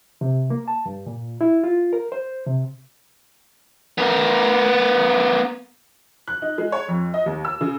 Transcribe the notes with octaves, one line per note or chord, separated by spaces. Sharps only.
C3
A#3
A5
G2
A#2
E4
F4
A#4
C5
C3
B3 A#4
F#6
D#4
G#3
C#5
F2
D#5
D#2
E6
C#3